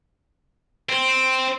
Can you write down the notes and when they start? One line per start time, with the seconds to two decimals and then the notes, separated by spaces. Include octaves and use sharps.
0.89 C4